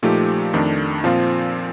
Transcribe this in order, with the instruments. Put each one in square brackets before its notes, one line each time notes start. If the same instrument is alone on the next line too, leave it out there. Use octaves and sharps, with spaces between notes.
[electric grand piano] A#2 F3 A3 D#4 G4
F2 D#3 A3 D4
A#2 F3 C4 F4